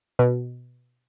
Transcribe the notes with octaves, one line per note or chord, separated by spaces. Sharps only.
B2